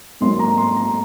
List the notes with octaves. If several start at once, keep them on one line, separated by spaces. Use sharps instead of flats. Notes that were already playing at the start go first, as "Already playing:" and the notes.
G#2 F#3 A#3 C6
A#5
C6
A#5